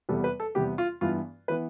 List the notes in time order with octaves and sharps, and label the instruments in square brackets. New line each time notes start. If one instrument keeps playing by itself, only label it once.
[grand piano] E2 C3 G3 B3 A4
B4
A4
E2 C3 G3 B3 G4
F4
G2 E3 B3 F4
E3 B3 B4